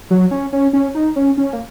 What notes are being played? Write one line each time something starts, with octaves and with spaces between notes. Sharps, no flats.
F#3
C#4
C#4
C#4
D#4
C#4
C#4
A#3